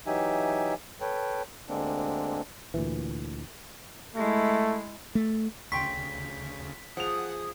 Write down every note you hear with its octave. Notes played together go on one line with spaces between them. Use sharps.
E3 F#3 D#4 G4 E5 G#5
A4 B4 C#5 G5
D2 D3 G#3 A#3 C4 D4
D2 A#2 E3
G#3 A3 E4
A3
D2 C#3 G5 C6 C#6 B6
F3 G#4 F#5 D#6 F7